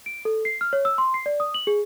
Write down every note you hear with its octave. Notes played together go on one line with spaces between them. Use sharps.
D7
A4
C7
F6
C#5
E6
C6
C7
D5
D#6
F#7
G#4